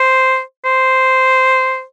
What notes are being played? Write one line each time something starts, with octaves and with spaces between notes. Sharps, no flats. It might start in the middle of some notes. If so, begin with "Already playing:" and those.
Already playing: C5
C5